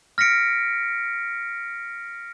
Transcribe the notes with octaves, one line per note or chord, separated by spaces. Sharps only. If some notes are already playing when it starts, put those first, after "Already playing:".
F6 A#6 B6 C#7 D7